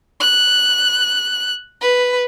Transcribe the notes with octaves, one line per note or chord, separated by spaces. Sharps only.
F#6
B4